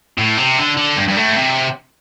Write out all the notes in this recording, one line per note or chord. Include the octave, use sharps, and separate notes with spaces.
A2
C3
D3
D3
G2
G2
A2
C3